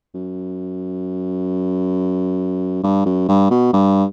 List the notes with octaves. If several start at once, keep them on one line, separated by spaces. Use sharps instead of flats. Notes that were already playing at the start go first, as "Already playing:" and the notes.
F#2
G2
F#2
G2
B2
G2